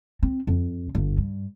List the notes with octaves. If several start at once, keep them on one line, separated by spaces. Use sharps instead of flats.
C4
F2
G1
G2